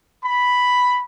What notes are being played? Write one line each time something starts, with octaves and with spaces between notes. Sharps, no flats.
B5